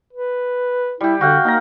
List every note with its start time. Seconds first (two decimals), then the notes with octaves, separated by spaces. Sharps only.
0.13 B4
1.01 G3 E4 G4
1.21 D3 F#4 F5 G5
1.45 A#3 D#4 A#4 A#5